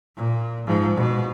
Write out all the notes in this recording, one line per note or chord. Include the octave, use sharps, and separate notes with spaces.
A#2
G#2 F3
B2